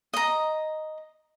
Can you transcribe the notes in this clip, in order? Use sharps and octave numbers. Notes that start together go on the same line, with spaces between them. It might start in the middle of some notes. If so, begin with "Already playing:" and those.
D#5 A#5